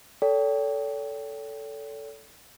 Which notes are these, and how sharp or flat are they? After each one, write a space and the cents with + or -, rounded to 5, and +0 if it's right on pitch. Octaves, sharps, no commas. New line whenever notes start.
A4 +0 C#5 +45 G5 +0